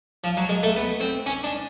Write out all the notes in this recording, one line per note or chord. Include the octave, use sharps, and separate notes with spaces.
F3
F#3
G#3
A3
B3
C4
C#4
D4